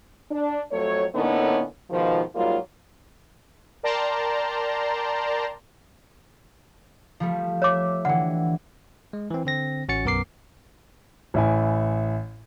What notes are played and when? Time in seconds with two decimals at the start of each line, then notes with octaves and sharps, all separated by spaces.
0.30 D4
0.72 F2 F#3 A3 C#5
1.15 A2 D3 A#3 B3 C#4 D#4
1.91 G#2 B2 D#3 F3
2.35 G#2 F#3 G3 A#3 F4
3.83 A#4 D5 G5 A5 A#5 C6
7.20 F3 G3 A3
7.62 C#5 E5 D6
8.05 D3 E3 F#5 G5
9.13 G#3
9.31 E3 C4
9.45 D3 C4 A#6
9.88 A1 C#4 F#4 A6 C#7
10.04 B1 F#2 B3 A#4 D6 C7
11.34 A1 E4 G#5